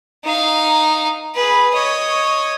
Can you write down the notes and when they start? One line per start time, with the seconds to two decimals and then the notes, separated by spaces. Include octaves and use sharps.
0.24 D#4 F5
1.35 G#4 B4
1.74 C#5 D#5